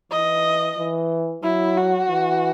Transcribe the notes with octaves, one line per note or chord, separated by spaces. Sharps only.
E3 D#5
E3
F#3 E4
F#4
E3